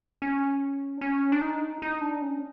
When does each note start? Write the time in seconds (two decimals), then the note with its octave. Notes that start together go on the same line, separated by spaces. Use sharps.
0.22 C#4
0.97 D4
1.01 C#4
1.32 D4
1.42 D#4
1.82 D#4
2.01 D4
2.22 C#4